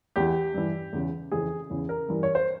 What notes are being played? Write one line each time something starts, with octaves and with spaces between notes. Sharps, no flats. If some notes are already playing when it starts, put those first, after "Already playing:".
E2 E3 G4
G2 E3
E2 C#3 E3
F2 C#3 E3 G#4
E2 C#3 E3
A#4
G2 E3
C#5
C5